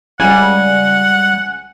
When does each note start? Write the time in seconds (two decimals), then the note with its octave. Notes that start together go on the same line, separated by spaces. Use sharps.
0.20 C#2 G3 F#5 G#5